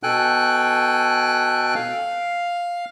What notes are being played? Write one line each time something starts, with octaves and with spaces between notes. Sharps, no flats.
B2 A4 G5 G#5 F#6
F5